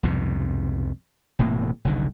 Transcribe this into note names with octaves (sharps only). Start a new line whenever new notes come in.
C2 F2 G#2 B2
E1 A2 C3 A#3
F#1 C2 D3 D#3